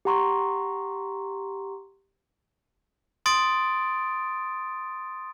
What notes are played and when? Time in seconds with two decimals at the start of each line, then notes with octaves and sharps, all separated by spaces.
0.05 G4 F#5 A#5 C6 C#6
3.26 C6 D#6 A6 D7